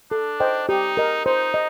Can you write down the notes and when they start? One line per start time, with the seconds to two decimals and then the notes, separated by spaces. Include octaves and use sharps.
0.11 D4 A4
0.40 C5 D#5 G5
0.69 D#4 G4
0.97 A#4 D#5
1.26 D#4 C5
1.54 D#5